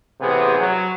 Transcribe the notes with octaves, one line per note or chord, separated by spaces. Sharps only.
A1 C3 B3 G#4
F#3